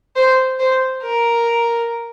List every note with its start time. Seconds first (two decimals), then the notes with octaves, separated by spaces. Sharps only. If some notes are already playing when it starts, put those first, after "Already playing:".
0.16 C5
0.60 C5
1.03 A#4